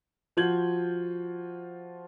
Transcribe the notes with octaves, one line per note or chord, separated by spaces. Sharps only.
F3 F4 F#4 G6 G#6 F#7